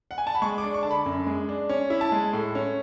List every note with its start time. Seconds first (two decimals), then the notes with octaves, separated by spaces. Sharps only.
0.11 F#5
0.18 G#5
0.27 A5
0.35 B5
0.42 G#3 C#6
0.58 D6
0.64 D4
0.74 C#6
0.83 D3 A5
0.91 B5
1.06 F#2
1.27 G#3
1.49 D4
1.69 C#4
1.90 E4
2.01 A5
2.12 G#3
2.33 A2
2.55 C#4